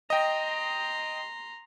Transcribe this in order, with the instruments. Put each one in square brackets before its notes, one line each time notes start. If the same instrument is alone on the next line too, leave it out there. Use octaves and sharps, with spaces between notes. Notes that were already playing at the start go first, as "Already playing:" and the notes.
[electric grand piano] D#5 G5 [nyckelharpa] A#5 C6